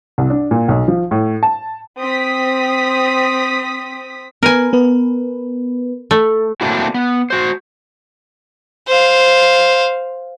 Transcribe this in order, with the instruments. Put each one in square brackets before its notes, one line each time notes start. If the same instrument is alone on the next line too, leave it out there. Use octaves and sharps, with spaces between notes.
[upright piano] C2
D4
A#2
B1
F3
A2
A5
[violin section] C4 D#6 B6
[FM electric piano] B3 B4 [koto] A#4 G#5
[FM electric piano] B3 B4
[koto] A3
[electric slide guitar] A3 A#3 C4 D4 E4 F#4
B3
F#4 C5
[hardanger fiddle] C5 F5